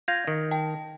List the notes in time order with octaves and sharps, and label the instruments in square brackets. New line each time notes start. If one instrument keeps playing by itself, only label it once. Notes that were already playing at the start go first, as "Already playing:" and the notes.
[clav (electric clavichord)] F4 F5 [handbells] G6 G#6 A#6
[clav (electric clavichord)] D#3
[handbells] G5 A5